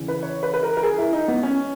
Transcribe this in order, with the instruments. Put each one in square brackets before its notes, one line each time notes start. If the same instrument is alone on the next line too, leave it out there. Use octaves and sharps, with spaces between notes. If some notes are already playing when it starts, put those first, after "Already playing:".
Already playing: [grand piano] E2 C#3 E3
B4
C#5
B4
B4
A#4
A#4
G#4
E4
D#4
B3
C#4